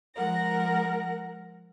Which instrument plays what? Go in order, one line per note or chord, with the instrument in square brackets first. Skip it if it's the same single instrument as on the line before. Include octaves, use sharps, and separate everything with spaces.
[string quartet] F3 G#3 A#4 F#5 A#6